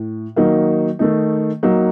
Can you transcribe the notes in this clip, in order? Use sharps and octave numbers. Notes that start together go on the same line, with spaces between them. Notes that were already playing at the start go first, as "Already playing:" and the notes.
Already playing: A2
D#3 F#3 A#3 D#4
D#3 A3 D#4
F#3 A#3 D#4